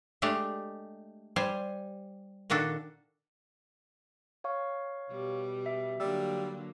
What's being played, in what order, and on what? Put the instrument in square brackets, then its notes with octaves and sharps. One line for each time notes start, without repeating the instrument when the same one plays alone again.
[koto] G#3 A3 D4 G4
G3 C5 G#5
A#2 D#3 D4 F#4 A4
[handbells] C#5 F5 C#6
[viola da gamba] B2 G3
[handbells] E5
[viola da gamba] D3 F#3 A#3 [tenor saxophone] G3 [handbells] E6